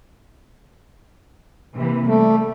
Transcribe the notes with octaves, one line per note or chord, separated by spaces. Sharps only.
C3 E3 A#3
G3 A3